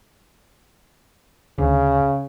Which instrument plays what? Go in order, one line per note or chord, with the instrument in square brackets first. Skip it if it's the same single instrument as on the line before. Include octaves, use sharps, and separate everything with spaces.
[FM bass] D2 [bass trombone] C#3